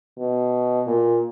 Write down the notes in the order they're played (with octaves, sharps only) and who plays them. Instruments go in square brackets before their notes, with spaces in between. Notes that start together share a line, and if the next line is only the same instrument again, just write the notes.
[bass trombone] B2
A#2